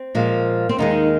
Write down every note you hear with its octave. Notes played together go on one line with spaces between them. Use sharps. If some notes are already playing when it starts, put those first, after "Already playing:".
Already playing: C4
A#2 F3 G#3
C4
D#2 D#3 G#3 D#4